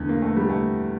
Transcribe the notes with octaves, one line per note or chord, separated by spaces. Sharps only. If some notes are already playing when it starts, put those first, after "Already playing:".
Already playing: E2 D3 A3
A#3
A3
G3
A3